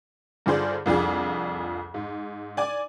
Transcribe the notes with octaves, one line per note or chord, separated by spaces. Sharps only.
G2 D3 F4 G#4 C5 D5
C2 F2 D4 F4 G#4
G#2
D5 G#5 D6